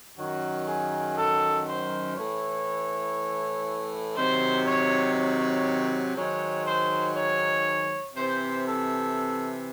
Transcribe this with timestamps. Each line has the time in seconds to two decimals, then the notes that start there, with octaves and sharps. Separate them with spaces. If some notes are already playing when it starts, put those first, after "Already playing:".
0.16 F#2 D#3 F#3 F#4
0.66 G#4
1.16 A4
1.66 C5
2.15 A2 E3 C#5
4.16 C3 D#3 F#3 C5
4.66 C#5
5.15 C#5
6.16 G#2 D#3 F#3 C#5
6.65 C5
7.16 C#5
8.16 C3 E3 C5
8.66 A4